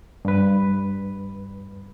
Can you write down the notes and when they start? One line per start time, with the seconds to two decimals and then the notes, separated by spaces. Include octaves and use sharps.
0.25 G2 B4